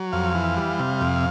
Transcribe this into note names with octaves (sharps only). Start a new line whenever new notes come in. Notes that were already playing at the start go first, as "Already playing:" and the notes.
Already playing: F#3
F2 F5
E3
G3
C3
F2